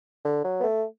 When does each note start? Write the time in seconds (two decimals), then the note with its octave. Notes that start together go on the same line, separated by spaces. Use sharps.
0.25 D3
0.44 F#3
0.60 B3
0.64 A3